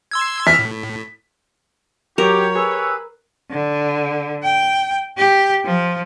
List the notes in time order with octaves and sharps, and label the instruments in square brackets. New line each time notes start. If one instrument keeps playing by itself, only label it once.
[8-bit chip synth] C6 E6 G#6
[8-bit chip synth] E3 E5 F6 [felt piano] B6
[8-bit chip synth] A2
[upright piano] F#3 [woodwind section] G4 [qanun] A#4 [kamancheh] C#5
[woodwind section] G4 B4 E6 [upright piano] G#4
[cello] D3
G5
G4
F3